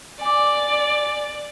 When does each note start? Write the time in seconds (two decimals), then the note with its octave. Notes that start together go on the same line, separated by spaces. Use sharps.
0.21 D5 G#5 D6